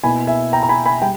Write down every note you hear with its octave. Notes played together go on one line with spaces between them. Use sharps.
B2 A#3 E4 G#5 B5
E5 G#5
G5 A#5
A#5
G#5 B5
G#5 B5
G3 G5